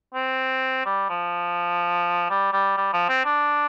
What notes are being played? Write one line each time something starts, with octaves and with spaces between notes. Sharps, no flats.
C4
G3
F3
G3
G3
G3
F3
C4
D4